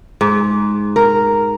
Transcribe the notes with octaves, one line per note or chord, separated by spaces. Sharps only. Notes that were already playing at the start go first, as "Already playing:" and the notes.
G#2
A#4